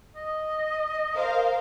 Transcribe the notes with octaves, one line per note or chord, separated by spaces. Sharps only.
D#5
A#4 C5 F5